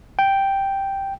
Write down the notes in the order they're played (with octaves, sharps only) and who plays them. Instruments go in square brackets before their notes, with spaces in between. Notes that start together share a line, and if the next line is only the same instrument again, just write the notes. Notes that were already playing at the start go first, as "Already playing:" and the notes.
[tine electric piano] G5